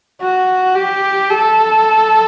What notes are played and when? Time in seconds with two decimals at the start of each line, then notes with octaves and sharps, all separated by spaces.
0.21 F#4
0.75 G4
1.31 A4